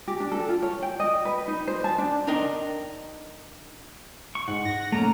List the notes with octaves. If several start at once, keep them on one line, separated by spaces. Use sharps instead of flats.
G4
D4
A4
F4
C#5
G5
D#5
B4
D#4
C5
A5
D4
D4 D#4 A#4 D#5 G5
C#6
G#2 F#5
A#6
A3 A#3 C#4 A#5